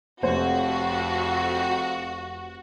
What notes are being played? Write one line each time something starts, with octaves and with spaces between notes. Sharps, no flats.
F1 F2 F#4 C5 C#5